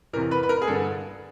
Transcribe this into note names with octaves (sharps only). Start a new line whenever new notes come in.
E2 C3 E3 A#4
B4
B4
A#4
G#4
G2 D3 A4